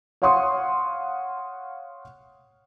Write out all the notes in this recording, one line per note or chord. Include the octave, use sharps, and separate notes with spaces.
C#5 F5 F#5 C6 C#6 D#6